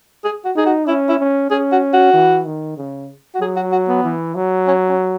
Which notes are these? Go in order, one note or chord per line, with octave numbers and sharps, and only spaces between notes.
G#4
F#4
D#4 G#4
F#4
C#4 E4
E4
C#4
C#4 G#4
F#4
F#4
E3
D#3
C#3
F#4
F#3 G#4
F#4
F#4
B3
E3
F#3
C#4
C#4